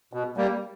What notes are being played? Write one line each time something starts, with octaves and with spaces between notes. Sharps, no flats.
B2
G3 A#3